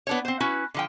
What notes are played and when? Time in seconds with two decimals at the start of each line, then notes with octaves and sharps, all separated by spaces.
0.07 B3 D4 C#5
0.25 C4 C5
0.40 C#4 E4 F#4 B4
0.74 D3 F3 G5